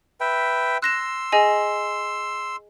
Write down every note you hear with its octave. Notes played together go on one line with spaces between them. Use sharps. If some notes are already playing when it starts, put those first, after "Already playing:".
B4 E5 G5
C6 E6 F#6 A#6 E7
G#4 D#5 G#5